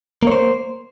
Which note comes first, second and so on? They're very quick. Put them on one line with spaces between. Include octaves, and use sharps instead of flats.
A#3 C#5 C5